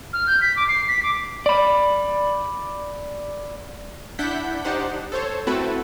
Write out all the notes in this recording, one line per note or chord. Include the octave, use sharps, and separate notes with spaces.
F6
G6
B6
D6
C7
B6
D6
D5 B5
D4 E4 F#5 G6 B6
D4 D#4 G4 C5 F#5
A4 C5 C#5
A3 C4 E4 F#4 A4 B4